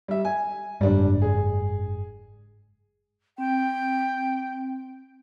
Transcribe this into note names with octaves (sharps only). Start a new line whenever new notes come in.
G3 E5
G#5
F#1 G#2 G3 D4
G#4
C4 G5